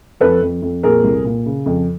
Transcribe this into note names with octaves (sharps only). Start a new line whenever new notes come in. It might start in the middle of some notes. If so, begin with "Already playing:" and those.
F2 A4 B4
F2
F2
A#2 G#4 A#4
C2
A#2
C#3
F2